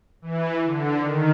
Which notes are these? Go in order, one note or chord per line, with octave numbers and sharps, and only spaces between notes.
E3
D3
D#3